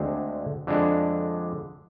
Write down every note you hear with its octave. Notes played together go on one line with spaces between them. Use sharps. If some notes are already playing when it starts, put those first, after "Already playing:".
Already playing: D2 D3 G#3 C4
F2 D3 G#3 D4